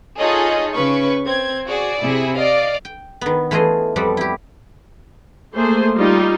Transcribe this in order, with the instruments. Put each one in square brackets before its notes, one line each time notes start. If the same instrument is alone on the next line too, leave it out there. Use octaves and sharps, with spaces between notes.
[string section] D#4 F4 G#4 A4 C#5 D#5
C#3 C#4 B4 C#6
C4 G#6
F#4 G#4 D5
C3 E4 G#4
D5 D#5 F5
[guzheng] G5
D#3 B3
E3 A3 F4 G#4 D#5
F2 G3 B3 F#4 A4 D5
E4 G4
[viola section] A3 A#3 G#4 C5
G3 D#4 F4